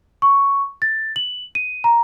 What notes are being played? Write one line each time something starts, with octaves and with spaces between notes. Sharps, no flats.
C#6
A6
F#7
D#7
A#5